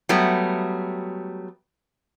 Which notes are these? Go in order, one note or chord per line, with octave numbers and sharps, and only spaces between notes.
F#3 G3 A3 B3